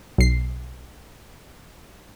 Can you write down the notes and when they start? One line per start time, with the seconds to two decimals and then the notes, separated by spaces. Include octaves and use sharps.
0.18 B1 C7